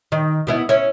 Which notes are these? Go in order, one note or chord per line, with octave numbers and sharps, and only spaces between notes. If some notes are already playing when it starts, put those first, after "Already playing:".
D#3
B2 B3 E4
C#4 E4 C#5